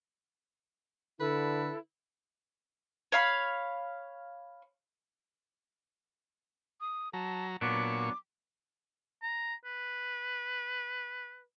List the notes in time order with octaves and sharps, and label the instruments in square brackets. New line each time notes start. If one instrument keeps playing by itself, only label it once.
[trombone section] D3 [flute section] E4 A4 [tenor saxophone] B4
[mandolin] C#5 F5 B5
[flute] D#6
[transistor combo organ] F#3 A#5 [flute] A5
[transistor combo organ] A#2 C#6 [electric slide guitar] F#3 B3 D4 [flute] D6
[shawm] A#5
B4